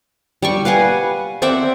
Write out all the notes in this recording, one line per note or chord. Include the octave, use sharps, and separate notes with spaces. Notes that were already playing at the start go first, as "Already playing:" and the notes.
G3 D5 C#6
B4 F5 F#5 G#5
C4 D5 E5 F#5